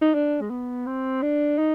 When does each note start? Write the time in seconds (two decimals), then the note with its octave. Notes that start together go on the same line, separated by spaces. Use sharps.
0.02 D#4
0.14 D4
0.41 G#3
0.50 B3
0.86 C4
1.22 D4
1.58 D#4